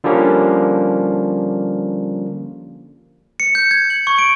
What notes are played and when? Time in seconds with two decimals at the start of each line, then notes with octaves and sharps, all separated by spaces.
0.04 D3 F3 G3 A#3 C#4
3.40 C#7
3.55 G6
3.71 G#6
3.90 F#7
4.07 C#6
4.18 D7